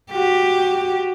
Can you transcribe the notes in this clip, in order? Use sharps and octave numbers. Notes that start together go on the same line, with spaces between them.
F#4 G4